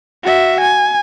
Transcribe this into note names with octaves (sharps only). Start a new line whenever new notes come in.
F#4 E5
G#5